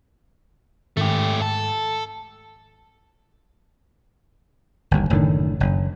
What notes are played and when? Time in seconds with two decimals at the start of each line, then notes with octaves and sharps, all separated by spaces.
0.97 G#2 D#3 A3 G4
1.42 A4
4.91 G1 D#2
5.10 F#1 A2 D3 D#3
5.60 F#1